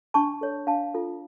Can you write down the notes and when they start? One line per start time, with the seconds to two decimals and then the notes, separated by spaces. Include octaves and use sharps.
0.14 D4 A5 C#6
0.41 A4 C#5
0.67 D4 F5 A5
0.94 F4 A4